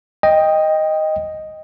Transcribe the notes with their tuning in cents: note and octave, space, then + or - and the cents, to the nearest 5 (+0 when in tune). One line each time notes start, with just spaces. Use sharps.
D#5 +0 G5 +10